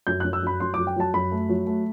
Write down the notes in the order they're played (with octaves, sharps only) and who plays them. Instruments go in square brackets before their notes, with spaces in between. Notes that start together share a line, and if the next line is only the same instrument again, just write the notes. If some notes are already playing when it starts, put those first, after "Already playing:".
[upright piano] F#2 G6
F#2 F#6
E6
F#2 B5
F#2 C6
F#3 D6
G5
F#3 A5
F#2 B5
A3
F#3
A3